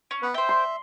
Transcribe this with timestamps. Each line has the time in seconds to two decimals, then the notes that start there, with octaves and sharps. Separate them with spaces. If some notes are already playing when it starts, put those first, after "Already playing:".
0.11 C#4
0.22 B3 B4 F#5
0.34 C5 E5 G5
0.49 C6